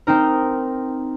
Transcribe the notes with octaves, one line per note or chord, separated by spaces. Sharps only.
C4 D#4 A#4